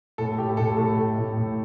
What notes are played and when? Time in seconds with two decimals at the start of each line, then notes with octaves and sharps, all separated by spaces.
0.18 A2 A4
0.38 A2 G4
0.57 A2 A4
0.77 A2 A4
0.97 A2
1.18 A2
1.37 A2